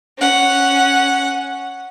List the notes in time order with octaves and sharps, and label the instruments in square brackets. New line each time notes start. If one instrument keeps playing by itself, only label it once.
[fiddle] C#4 F#5